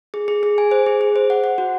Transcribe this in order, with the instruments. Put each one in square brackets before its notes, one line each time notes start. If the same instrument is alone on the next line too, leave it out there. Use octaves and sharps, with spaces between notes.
[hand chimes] G#4
G#4
G#4
G#5
C5
G#4
G#4
C5
F#5
F#5
F#4